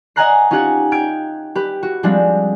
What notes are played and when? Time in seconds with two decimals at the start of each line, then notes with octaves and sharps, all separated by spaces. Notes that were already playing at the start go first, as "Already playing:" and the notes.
0.16 D#5 F#5 G#5 A#5 F#6 C7
0.51 C#4 D#4 F4 G4 F#5 G#5
0.92 G5 F6 G6 G#6 D7
1.55 G4 B4
1.83 F#4
2.03 F3 G3 G#3 C4 D4